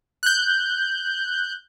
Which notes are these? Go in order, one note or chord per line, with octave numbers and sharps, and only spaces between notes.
F#6 G6